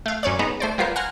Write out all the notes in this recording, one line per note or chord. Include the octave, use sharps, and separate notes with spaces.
A3 F5
F#2 C#4 C#5 D5
G#3 B3 D#4
A3 C5 D5
G3 B3 F4 A#4 C5
F#5 G#5 A#5 C6 F6